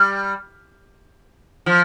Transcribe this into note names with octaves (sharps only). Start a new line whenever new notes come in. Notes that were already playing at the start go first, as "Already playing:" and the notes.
Already playing: G3
F3